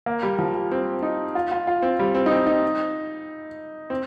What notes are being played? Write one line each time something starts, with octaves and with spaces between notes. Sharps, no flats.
A#3
G3
F3
G3
C4
D#4
F4
F4
F4
C4
G3
C4
D#4
C4
D#4
C4